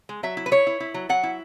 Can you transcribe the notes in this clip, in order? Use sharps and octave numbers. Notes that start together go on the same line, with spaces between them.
G#3
F#3 E5
E4
B4
E4 C#5
E4
E4
F#3
F#3 F#5
E4